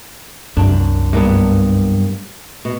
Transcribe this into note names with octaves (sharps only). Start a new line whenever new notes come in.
C2 F#2 D4
G2 A#3 B3
B2